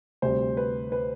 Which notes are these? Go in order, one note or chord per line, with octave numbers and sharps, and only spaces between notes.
D2 C3 G3 C5
B4
B4